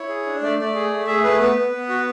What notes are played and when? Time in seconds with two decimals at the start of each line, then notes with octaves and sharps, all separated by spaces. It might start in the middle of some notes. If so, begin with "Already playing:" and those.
Already playing: E4 C#5
0.09 G#4
0.26 D4
0.42 A3 D5
0.59 A3 D5
0.75 G#4
0.90 A3
1.07 G#4 E5
1.24 A3 B4
1.40 B3 B4
1.56 B3
1.72 B3
1.89 F#4